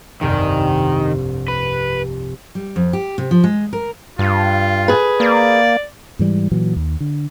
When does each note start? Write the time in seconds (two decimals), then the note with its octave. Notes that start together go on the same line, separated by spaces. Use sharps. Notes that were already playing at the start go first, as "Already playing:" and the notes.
0.21 F1 C2 G2 D#3
1.48 B4
2.55 G3
2.76 F2
2.93 G4
3.18 C3
3.31 F3
3.44 G#3
3.73 A#4
4.19 G2 F4
4.88 G#4 B4
5.20 A#3 D5
6.19 G#2 E3 G3
6.51 A#2 E3 F#3
6.76 D#2
7.00 D3